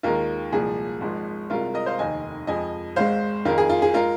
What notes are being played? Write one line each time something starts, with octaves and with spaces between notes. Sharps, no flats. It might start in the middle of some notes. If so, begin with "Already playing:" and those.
D#2 D#3 G#3 F4 A#4
C2 A#2 F3 G#3 G#4
G#1 G#2 F3 G#3
C2 C3 G#3 F4 A#4
A#4 D#5
C5 F5
F1 D#2 D#3 D#5 G#5
F2 F3 G#3 D#5 G#5
G#1 G#2 G#3 C5 F5
F2 D#3 G#3 F4 A#4
G#4
F4
G#4
G#3 F4 A#4